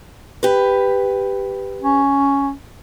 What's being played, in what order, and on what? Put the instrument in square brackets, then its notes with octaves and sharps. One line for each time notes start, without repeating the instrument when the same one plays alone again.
[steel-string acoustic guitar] G4 B4
[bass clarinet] C#4